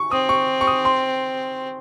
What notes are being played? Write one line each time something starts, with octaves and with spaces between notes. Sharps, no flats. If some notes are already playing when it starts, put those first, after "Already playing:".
Already playing: C#6
C4 D#6
C#6
C#6
D#6
C6